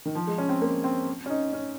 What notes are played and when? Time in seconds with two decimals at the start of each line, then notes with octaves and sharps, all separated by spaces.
0.05 D#3
0.15 F3
0.27 G#3
0.38 C#4
0.49 C4
0.61 A#3
0.84 C4
1.26 C#4
1.30 D#4
1.53 C#4